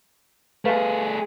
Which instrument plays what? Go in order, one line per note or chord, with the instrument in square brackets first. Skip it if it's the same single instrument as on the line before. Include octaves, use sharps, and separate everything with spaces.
[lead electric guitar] A3 G#4 [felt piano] B4 F5